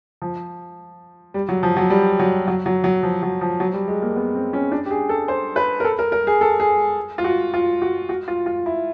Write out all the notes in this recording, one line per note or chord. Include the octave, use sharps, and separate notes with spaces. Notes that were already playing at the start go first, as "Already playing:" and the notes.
F3
G3
F#3
F3
F#3
G3
F#3
F#3
F#3
F#3
F3
F#3
F3
F#3
G3
G#3
A#3
B3
C4
C#4
D4
G4
G#4
A4
C5
B4
A#4
A4
A#4
A#4
G#4
A4
G#4
F4
F#4
F4
F#4
F#4
F4
F4
E4